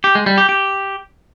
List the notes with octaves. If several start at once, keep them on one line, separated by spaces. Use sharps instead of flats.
G4
G#3
G3
G4
G4